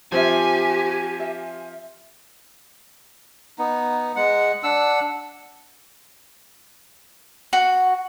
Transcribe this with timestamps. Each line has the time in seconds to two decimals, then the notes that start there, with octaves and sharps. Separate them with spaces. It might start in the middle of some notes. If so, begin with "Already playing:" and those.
0.12 F3 C4 F4 G4 C5 E5 G#5
1.20 E5
3.59 B3 D#4
4.16 G#3 F#5
4.63 D4 F#5 E6
7.53 F#4